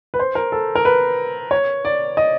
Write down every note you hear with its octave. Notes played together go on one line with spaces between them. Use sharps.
B4
C5
A#4
A4
A#4
B4
C#5
D5
D#5